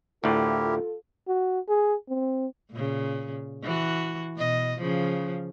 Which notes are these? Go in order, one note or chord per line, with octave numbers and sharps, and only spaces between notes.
D2 A2 E4 F4 G4 A4 A#4
F#4
G#4
C4
A#2 C#3
E3 F#4
B2 D#5
C#3 F3